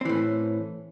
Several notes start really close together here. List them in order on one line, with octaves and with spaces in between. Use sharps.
C4 E3 A2 C#4